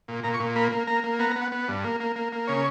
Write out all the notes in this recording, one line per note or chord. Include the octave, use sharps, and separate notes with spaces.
A#2
A#2 A#5
C#6
A#2
A#3 B5
A#3
A#3 A#5
A#3
B3 A#5
A#5
B3
F#5
B3
G2
A#3
A#3
A#3
A#3
C#3 C#5